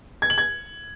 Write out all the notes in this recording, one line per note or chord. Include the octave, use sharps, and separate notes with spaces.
G#6
F#7
G#6